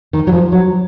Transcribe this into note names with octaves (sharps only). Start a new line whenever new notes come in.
D#3
F#3
F3
F#3